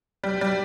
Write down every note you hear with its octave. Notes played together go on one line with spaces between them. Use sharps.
G3
G3